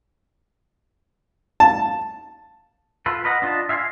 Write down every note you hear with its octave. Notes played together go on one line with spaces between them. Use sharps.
A5
F4 A4 B4
A#4 B4 D#5 F#5
D4 F4 D#5 A5
E5 F5 G#5 B5 C6